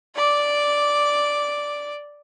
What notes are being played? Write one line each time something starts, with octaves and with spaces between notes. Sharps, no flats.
D5 D6